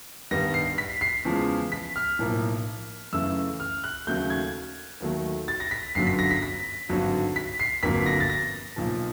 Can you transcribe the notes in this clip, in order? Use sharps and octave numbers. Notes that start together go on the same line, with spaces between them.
G2 D#3 G3 B3 A#6
C7
B6
C7
E2 C#3 F3 G#3
B6
F6
B1 A2 F3 A#3
F#2 C#3 E3 A3 E6
F6
F#6
D#2 C#3 F#3 A3 G6
G#6
D#2 D#3 F#3 A3
A6
A#6
B6
G1 F#2 D3 F#3 C7
B6
A#6
B6
B6
G#1 G2 D3 F#3
B6
C7
G1 F2 D3 F#3 A#3 B6
A#6
A6
A#6
B1 A#2 F3